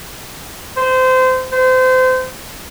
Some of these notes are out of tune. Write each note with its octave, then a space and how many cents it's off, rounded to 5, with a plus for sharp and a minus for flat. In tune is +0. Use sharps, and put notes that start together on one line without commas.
C5 -25
C5 -30